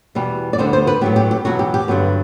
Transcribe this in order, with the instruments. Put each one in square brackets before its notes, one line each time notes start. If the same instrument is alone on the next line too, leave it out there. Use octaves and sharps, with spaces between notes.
[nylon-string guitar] E2 B2 G3
D5
D2 D3 G3 B3 C5
C5
B4
A2 F#3 B3 G4
G4
G4
E2 B2 F#3 B3 F#4
G4
G4
G2 D3 F#3 B3